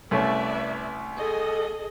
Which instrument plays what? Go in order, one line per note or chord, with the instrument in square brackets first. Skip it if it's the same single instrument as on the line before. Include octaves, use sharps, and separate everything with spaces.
[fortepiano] C2 A3 C#4 [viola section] B4 D5 E5
[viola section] G#4 A4 D#5